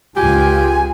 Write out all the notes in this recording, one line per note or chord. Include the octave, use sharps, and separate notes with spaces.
C#2 G#3 F4 G4 G#5